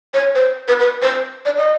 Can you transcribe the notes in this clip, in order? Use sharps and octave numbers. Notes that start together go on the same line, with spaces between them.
C#5
C5
B4
B4
C5
D5
D#5